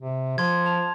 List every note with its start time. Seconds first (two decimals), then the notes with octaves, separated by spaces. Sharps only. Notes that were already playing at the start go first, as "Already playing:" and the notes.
0.01 C3
0.38 F3 C6 G#6
0.65 A5 F7